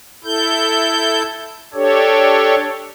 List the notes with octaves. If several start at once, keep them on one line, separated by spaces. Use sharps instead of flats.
E4 A4 G6
D4 G4 A4 C#5